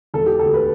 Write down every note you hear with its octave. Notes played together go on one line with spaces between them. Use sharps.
E1 A4
G4
D2 A4
B4